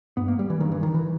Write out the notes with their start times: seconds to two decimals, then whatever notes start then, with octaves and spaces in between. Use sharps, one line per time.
0.17 G2 B3
0.28 A#3
0.39 G3
0.50 E3
0.60 G2 D#3
0.72 E3
0.83 D#3
0.94 E3